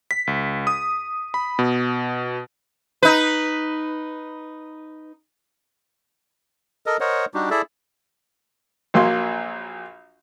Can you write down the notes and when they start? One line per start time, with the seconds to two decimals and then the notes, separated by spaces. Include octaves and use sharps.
0.11 B6
0.27 C#2
0.67 D#6
1.34 B5
1.59 B2
3.02 D#4 B4
6.86 A4 A#4 D#5
7.00 A#4 C5 C#5 D#5 F#5
7.34 G3 D4 D#4 F#4 G4
7.51 E4 G#4 A4 D5 E5
8.94 A#1 F#3 A#3 C6